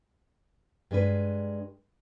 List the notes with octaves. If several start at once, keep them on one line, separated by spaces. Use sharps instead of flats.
G2 G#3 D4 B4